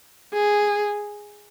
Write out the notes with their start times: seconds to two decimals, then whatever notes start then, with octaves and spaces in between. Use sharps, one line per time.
0.33 G#4